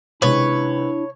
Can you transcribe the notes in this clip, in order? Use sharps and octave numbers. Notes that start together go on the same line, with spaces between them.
C3 D#3 G#3 D4 E4 B4 C#5